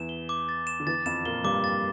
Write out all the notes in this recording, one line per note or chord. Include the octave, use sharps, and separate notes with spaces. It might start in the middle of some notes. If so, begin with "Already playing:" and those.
Already playing: E2 E3 E7
G7
D6
A6
E7
D3
E2 E3 A6
F2 F3 E7
A#2 A#3 G7
G2 G3 D6
A6